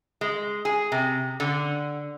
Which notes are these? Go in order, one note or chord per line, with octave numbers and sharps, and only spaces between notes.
G#3
G#4
C3
D3